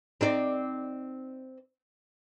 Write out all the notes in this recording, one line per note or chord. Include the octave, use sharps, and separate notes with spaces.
C4 D#4 D5